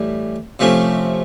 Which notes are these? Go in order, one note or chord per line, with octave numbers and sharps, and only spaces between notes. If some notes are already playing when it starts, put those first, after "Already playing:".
Already playing: A2 E3 G3
C3 F3 A3 C#4